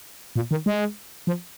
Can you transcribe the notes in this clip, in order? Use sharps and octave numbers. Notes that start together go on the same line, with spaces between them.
A#2
D#3
G#3
F3